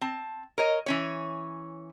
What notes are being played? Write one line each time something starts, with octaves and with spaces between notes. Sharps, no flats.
C4 A5
A#4 C#5 D#5
E3 C#4 C#5